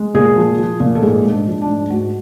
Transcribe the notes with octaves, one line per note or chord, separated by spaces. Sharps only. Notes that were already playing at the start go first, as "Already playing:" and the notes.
Already playing: G#3
A#2 G#4
F3
F3
A#2
A4
G#2 G#4
G#2
D4
F3
D4
G#2
G#2 F#4